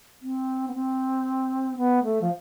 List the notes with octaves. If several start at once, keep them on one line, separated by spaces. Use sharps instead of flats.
C4
B3
C4
B3
A3
F3